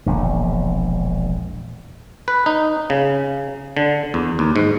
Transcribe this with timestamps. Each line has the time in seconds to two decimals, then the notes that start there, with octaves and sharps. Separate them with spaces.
0.06 E1 A#1 D3
2.28 B4
2.46 D#4
2.90 C#3
3.77 D3
4.14 E2
4.39 D#2
4.56 G#2